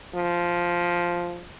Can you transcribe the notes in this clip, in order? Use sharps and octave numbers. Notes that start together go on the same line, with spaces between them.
F3